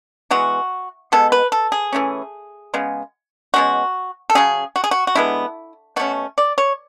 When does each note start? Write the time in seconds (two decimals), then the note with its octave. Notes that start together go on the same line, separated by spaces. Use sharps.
0.31 E3 G#3 B3 F#4
1.12 B2 G#3 B3 A4
1.32 B4
1.52 A4
1.72 G#4
1.93 E3 A3 C#4
2.74 C#3 G#3 B3
3.54 B2 G#3 C#4 F#4
4.30 A4
4.35 C#3 F#3 C#4 G#4
4.76 F#4
4.84 G#4
4.91 F#4
5.07 F#4
5.15 D3 G#3 B3 E4
5.96 B2 A3 C#4 F#4
6.38 D5
6.58 C#5